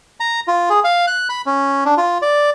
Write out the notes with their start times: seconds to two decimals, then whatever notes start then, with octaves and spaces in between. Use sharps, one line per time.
0.20 A#5
0.48 F4
0.70 G#4
0.84 F5
1.07 F#6
1.29 B5
1.46 C#4
1.85 D4
1.97 F4
2.22 D5